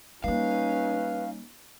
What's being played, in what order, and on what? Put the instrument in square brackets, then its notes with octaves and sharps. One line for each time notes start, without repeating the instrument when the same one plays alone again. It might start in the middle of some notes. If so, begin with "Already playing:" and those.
[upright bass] G3 A#3 [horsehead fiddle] C#4 D#4 [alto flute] B4 [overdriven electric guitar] F5